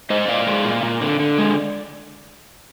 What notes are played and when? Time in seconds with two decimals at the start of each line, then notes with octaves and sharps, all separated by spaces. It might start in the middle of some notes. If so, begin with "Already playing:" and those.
0.10 G#3 C5 D#5
0.28 A#2 D5 F5
0.47 G#3
0.65 A#2
0.83 A#2
1.01 D3
1.20 D3
1.38 G#3